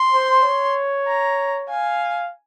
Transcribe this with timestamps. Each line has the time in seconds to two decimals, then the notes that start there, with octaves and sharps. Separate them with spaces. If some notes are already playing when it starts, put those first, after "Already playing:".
Already playing: C6
0.12 C5
0.43 C#5
1.07 A#5
1.70 F5 G#5